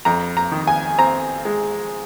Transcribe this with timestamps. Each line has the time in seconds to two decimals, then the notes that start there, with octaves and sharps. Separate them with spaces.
0.05 F2 A#5
0.37 A#5
0.52 D#3
0.67 G#5
0.98 C4 A#5
1.45 G#3